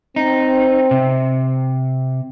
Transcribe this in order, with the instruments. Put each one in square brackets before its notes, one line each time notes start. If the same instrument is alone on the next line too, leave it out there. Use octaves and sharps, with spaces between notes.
[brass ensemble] C4 [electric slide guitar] D#4
[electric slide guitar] C3